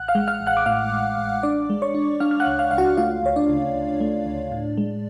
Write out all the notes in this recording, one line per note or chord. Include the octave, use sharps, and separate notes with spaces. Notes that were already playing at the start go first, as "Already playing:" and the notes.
Already playing: A1 F#5 F#6
F5 F6
G#3
F5 F6
A1
F#5 F#6
D6
A2 F5 F6
A1
A1
D4 D5 D6
G#3
C#5 C#6
D4
D4 F5 F6
F6
F#5 F#6
C#2
F5 F6
C#2 F5
F#4 F#5
A3 F4 F5
D2 C#5
D4 D5
C#3
D2
A3
D2
A2
G#3